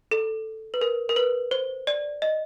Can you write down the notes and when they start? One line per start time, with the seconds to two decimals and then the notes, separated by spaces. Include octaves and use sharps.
0.11 A4
0.74 B4
0.81 A#4
1.09 A#4
1.16 B4
1.51 C5
1.87 D5
2.22 D#5